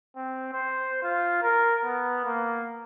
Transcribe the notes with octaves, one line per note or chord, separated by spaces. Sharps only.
C4
C5
F4
A#4
B3
A#3